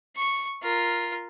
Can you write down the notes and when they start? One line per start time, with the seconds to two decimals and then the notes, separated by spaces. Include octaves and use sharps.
0.16 C#6
0.62 F4 A#4